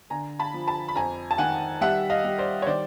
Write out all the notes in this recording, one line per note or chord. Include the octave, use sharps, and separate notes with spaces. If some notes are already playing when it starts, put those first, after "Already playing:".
D3 G#5 A#5
A5 B5
F3
A5 B5
B5
F2 G#5 A#5
A5
D#3 F#5 G#5
G3 E5 F#5
D#5 F5
G3
C5 D5
C#5
D#3 C5 D5